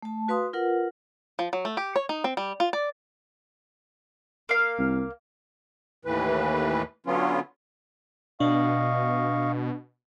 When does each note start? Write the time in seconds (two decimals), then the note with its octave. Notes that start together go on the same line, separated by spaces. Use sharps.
0.02 A3 A5
0.28 F#4 B4 F5 C6 D#6
0.53 F4 A#4 B4 F#5
1.39 F3
1.53 F#3
1.65 A3
1.77 G4
1.96 C#5
2.09 D#4
2.24 C4
2.37 G3
2.60 F4
2.73 D5
4.49 A#3 F5
4.78 C2
6.05 D#2 A2 E3 B4
7.06 D3 F#3 B3 C#4 F4
8.40 B2 D4 D#5 F5 C#6